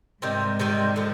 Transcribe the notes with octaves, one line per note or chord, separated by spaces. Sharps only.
G#2 C3 D#3 G3
C3 D#3 G3
D3 F3